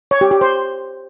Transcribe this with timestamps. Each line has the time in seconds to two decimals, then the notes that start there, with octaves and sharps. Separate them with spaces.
0.11 C#5
0.21 G4
0.31 G4
0.41 C5